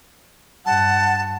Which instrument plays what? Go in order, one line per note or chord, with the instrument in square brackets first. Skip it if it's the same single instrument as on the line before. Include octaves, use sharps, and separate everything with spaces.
[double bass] G2 [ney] F#5 [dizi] A5